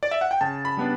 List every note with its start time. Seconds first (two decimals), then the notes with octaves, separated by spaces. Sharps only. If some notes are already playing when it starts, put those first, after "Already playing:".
0.03 D5
0.11 E5
0.21 F#5
0.31 G5
0.41 C#3 A5
0.65 B5
0.77 G3 B3 D4